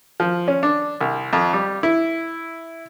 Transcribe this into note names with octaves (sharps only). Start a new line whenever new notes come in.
F3
C#4
D4
C2
F2
G3
E4